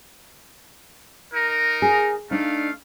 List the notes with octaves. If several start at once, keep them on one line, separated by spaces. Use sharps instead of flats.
D#4 A#4
G#4
A3 D4 D#4 F5